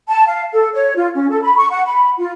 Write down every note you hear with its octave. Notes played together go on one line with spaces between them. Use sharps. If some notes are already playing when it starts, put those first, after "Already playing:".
A5
F5
A4
C#5
F4
C#4
A4
B5
C#6
F#5
B5
F4